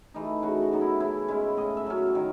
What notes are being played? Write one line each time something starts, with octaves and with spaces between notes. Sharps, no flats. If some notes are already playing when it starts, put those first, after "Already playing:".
E3 A3 D#4
C#3 F#4
F#4
F#3 B3 D#4
E4
C#3 E4
G#3 C#4 E4
A2 D#5
E5
F#3 C#4
D#3